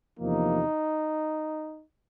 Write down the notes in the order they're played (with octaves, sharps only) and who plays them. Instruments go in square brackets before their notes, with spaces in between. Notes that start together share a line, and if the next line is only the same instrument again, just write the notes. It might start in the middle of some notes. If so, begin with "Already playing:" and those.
[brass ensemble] E2 C3 F3 A#3 D#4